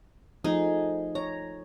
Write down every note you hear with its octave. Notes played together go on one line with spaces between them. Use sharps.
F3 A3 D#4 G#4
C#5 A#5